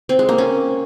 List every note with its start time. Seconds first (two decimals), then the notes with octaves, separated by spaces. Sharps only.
0.09 C4
0.19 G#3
0.29 A#3
0.38 C#4